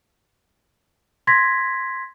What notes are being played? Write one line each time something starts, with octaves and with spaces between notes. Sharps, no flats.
C6 G#6 A#6 B6